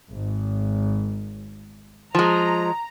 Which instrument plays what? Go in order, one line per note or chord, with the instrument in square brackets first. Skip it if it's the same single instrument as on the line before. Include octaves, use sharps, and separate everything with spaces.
[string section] G#1
[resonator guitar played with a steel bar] F3 G#3 [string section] A#5